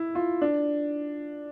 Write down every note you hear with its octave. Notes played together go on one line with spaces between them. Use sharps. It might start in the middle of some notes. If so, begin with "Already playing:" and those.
Already playing: E4
F4
D4